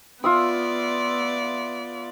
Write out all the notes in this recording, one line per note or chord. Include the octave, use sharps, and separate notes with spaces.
B3 F4 D5 E5 D#6